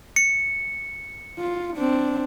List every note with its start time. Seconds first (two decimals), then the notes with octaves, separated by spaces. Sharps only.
0.16 C#7
1.39 F4
1.77 C4 D4